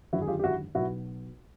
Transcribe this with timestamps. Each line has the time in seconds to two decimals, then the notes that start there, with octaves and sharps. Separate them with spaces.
0.12 G#1 F#2 D3 E4 F#4
0.21 G#4
0.28 F4 G4
0.39 G4
0.43 E4 F#4
0.75 B1 B2 E4 F#4